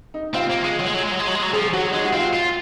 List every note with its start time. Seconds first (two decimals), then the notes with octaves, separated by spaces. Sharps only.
0.14 D#4
0.34 C4 F4
0.50 A#3
0.64 G#3
0.79 F#3
0.87 G#3
0.95 F#3
1.04 G#3
1.12 F#3
1.19 G#3
1.28 F#3
1.35 G#3
1.43 F#3
1.53 F3 G#4
1.73 F#3 F#4
1.93 G#3 D#4
2.04 F#4
2.13 C4 F4
2.33 F4